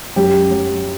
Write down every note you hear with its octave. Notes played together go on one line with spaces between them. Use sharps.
F#2 F#3 G4
F#3